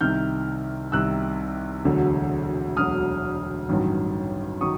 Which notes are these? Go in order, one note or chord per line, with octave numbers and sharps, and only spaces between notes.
C2 C3 D#3 F6 G6
C2 C3 D#3 E6 F#6
E1 D2 D3 F#3
E1 D2 D3 F#3 D#6 F6
A1 G2 D#3 F#3
D#3 F#3 C#6 D#6